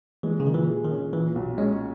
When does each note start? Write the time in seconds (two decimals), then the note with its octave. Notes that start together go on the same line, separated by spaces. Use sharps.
0.23 E3 G#3
0.40 C#3
0.46 A#2 D#3
0.54 E3
0.69 G#4
0.84 D#3
0.91 C#4
1.13 A#2 E3
1.35 B1
1.58 G#3 C#4